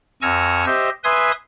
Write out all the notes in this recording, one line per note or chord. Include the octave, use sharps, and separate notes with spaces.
F2 G#5 C#6 E6 F6 A#6
G4 C5 D#5 E5
B4 E5 G#5 C6 D#6 G#6